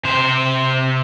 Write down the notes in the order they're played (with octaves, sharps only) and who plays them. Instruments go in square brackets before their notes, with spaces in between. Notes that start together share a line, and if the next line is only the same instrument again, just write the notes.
[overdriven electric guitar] C3 C5